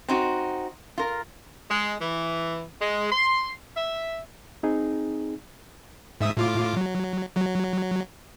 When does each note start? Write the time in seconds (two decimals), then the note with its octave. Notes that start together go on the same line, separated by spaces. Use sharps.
0.08 C4 D#4 F#4
0.98 F4 A#4
1.70 G#3
2.00 E3
2.81 G#3
3.12 C6
3.76 E5
4.63 C4 D#4 G#4
6.21 G#2 E5 D#6
6.37 A2 F4 D6
6.77 F#3
7.37 F#3